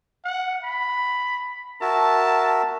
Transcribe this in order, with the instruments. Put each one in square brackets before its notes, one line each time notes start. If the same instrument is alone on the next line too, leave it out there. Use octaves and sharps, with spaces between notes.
[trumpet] F#5
B5
[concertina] F#4 A#4 E5 [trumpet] A5